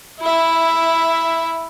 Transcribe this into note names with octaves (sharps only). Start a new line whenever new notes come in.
E4 E5